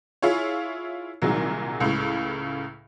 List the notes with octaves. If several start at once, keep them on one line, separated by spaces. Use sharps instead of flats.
E4 F4 G#4 C#5
C2 A#2 D#3 F#3 G#3
C#2 A2 C#3